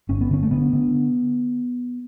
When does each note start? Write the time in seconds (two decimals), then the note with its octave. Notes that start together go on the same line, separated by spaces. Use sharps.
0.09 G1 C#4
0.21 B3
0.31 D3 C#4
0.43 A3
0.51 D3 B3
0.73 D3